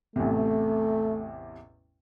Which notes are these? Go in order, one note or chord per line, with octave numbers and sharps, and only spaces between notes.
A1 E2 C3 A3